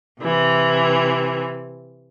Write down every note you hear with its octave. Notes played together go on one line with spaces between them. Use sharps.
C3 E3